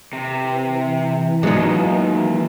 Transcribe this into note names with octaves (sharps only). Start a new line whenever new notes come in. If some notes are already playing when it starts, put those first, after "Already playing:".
C3 E3
D#2 A#2 F#3 G#3 B3 D#4